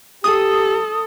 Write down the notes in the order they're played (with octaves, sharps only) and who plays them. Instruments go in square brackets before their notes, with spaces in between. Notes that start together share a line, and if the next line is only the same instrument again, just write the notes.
[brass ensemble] G4 [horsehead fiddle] A4 [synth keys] D#6